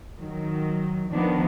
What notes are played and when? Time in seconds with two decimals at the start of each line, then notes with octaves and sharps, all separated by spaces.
0.20 D#3 F#3
1.12 D#3 F3 B3 D4